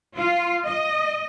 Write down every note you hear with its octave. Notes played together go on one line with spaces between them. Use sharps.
F4
D#5